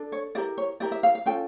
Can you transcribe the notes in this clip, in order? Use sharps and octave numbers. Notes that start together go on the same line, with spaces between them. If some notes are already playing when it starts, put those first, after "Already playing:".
Already playing: D4 A4
C#5
E4 G4 A#4 D5
C#5
E4 G4 A#4 D5
E5
F5
F5
C#4 F4 A4 G5